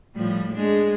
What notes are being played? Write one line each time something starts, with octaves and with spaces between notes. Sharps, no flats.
A2 F3 G3
G#3 D4